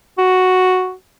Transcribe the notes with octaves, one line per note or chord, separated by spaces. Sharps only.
F#4